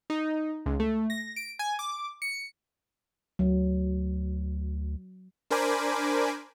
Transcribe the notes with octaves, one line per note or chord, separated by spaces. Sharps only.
D#4
C#2
A3
A#6
D7
G#5
D6
C#7
D2 F#3
D4 A#4 C5 G#5 B5 D6